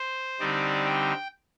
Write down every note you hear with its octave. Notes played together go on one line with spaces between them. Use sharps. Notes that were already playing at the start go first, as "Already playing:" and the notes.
Already playing: C5
D3 G3 C4 D#4 D5
G5